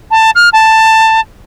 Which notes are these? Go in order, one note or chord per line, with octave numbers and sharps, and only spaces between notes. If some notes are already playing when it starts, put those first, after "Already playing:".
A5
F6
A5